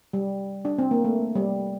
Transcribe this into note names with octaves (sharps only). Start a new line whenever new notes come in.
G3
D4
C4
A#3
A3
G3